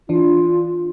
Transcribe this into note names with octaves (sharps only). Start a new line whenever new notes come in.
E3 D4 F4